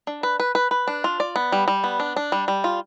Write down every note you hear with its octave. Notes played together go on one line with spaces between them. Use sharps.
D4
B4
B4
B4
B4
D4
F4
D5
B3
G3
G3
B3
D4
D4
G3
G3
F4